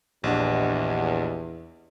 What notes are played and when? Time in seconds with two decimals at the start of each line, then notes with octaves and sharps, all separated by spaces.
0.24 A#1 E2 D4 G4 D#5 F#5